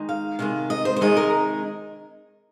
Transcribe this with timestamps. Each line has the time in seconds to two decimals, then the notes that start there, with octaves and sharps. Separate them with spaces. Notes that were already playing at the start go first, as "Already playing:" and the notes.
Already playing: D#3 G#3 D#4
0.09 F5
0.39 C3 D#3 G#3 F5
0.70 D#5
0.85 C5
0.96 C5
1.01 C3 D#3 G#3 D#4 D#5
1.17 A#4